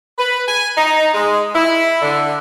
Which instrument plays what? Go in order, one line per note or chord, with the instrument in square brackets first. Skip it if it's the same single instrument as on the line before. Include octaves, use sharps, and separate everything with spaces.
[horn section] B4
G#5
D#4
G#3
E4
D3